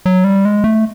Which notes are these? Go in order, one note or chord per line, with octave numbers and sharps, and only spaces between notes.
F#3
G3
G#3
A3